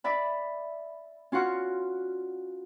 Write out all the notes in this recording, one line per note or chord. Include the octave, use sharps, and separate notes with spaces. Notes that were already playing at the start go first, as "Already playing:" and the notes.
D5 E5 B5
C#4 F4 F#4 F#5 C6